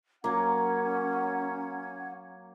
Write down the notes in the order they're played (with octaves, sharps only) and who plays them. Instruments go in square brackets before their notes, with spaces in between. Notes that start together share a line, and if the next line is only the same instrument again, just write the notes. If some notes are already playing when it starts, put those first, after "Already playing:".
[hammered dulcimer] F#3 A#3 [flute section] C#4 F#5 G#6